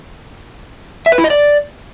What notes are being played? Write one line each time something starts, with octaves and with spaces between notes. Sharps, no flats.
E5
B4
E4
D#5
D5